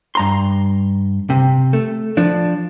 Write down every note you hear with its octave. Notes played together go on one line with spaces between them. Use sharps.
G2 A#5 C6
C3
A3
F3 D4